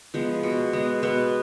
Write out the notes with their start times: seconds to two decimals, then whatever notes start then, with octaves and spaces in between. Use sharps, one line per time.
0.14 F3 G#3 B3
0.43 B2
0.73 G#3 B3
1.03 B2 B3